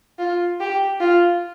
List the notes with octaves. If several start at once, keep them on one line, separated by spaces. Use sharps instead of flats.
F4
G4
F4